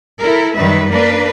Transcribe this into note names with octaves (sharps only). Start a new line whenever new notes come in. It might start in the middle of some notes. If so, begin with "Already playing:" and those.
E4 A4 A#4
F#2 D#3 G3 B4 E5
A#3 D4 A#4 B4